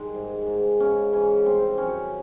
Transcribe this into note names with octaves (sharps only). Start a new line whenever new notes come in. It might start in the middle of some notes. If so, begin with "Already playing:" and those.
Already playing: D#3 G3 G#3
G#2
G#2
C#3 C#4
E3 C#4
G3 C4
F#2 C#4